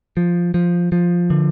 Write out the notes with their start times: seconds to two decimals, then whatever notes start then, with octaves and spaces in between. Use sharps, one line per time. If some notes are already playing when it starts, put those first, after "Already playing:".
0.17 F3
0.54 F3
0.92 F3
1.30 D3